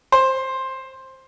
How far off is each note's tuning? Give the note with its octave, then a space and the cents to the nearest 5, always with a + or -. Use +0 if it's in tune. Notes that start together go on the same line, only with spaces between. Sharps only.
C5 +10